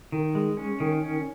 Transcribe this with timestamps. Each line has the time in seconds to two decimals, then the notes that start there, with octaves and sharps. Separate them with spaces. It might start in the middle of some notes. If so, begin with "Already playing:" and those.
0.12 D#3
0.35 G#3
0.57 C#4
0.80 D#3
1.02 C#4